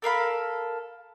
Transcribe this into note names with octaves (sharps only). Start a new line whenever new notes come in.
A4 A#4 F5 B5